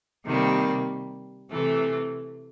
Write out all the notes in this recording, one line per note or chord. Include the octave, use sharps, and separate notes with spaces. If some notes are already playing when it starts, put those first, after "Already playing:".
C3 D#3 G3 A#3
C3 E3 A3